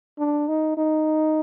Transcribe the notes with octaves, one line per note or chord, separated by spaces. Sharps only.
D4
D#4
D#4